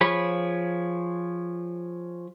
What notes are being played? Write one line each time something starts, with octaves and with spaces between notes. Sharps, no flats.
F3 G#4 C#5 B5